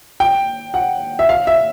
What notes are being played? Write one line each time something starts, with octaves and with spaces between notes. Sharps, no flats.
G5
F#5
E5
F5
E5